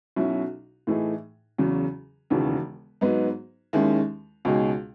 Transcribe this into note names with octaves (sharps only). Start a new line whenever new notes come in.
B1 B2 F#3 C#4 E4
A2 E3 A3 D#4 G#4
E2 C#3 F#3 C#4
E1 D#2 C#3 E3
G#2 F#3 B3 D#4
D#2 D#3 G#3 C#4 E4
C#2 B2 G#3 D#4 G#4